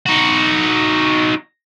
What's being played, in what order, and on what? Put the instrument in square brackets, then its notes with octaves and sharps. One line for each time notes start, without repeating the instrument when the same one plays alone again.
[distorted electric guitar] D#4 F#4